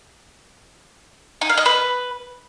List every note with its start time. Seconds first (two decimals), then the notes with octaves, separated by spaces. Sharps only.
1.41 D#4
1.49 F5
1.58 D#5
1.66 B4